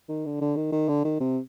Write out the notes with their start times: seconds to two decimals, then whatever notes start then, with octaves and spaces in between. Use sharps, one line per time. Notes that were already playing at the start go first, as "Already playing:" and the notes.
0.09 D#3
0.26 D3
0.41 D3
0.57 D#3
0.72 D#3
0.88 D3
1.05 D#3
1.20 C3